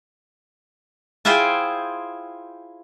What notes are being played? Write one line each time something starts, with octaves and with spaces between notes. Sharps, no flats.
E4 F4 G#4 C5 E5 G5